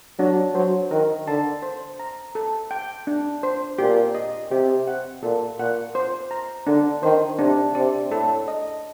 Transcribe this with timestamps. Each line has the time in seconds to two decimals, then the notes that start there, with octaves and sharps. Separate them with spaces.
0.19 F#3 D4
0.54 F#3 C5
0.91 D#3 A#4
1.27 D3 A5
1.62 C5
2.00 A#5
2.35 A4
2.71 G5
3.07 D4
3.43 C5
3.79 A#2 G4
4.15 D#5
4.51 C3 G4
4.87 F#5
5.23 A#2 A4
5.60 A#2 F#5
5.95 C5
6.31 A#5
6.67 D3 D4
7.03 D#3 C5
7.39 C3 D4
7.75 C3 D5
8.11 A2 A4
8.48 D#5